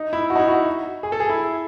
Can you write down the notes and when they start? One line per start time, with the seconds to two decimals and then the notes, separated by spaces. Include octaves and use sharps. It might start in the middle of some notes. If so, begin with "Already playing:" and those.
Already playing: D#4
0.13 E4
0.30 F#4
0.35 D#4
0.40 E4
0.48 F#4
1.03 G#4
1.12 A4
1.20 G#4
1.30 E4